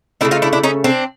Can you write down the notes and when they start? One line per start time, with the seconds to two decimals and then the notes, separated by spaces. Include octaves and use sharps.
0.21 C#3 F#3 A3 D4 E4
0.31 D#4 F4
0.42 D4 E4
0.53 D4 E4
0.63 C#4 D#4
0.84 C4 D4